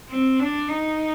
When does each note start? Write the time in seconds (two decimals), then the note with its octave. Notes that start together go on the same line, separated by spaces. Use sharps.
0.10 C4
0.39 D4
0.68 D#4